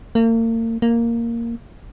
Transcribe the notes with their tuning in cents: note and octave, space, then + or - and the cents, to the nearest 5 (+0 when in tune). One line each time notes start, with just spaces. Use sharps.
A#3 -40
A#3 -5